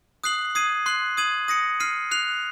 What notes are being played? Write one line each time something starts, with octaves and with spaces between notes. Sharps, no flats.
D#6 F#6 C7 F#7
D#6 G#6 C7 D#7
C6 F#6 C7 F#7
D#6 G#6 D#7 F#7
D#6 A#6 C#7
F6 C7 D#7
F#6 C7 F7